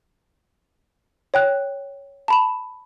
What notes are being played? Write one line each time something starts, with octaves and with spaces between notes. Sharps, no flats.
C#5 G5 F#6
A5 B5 E7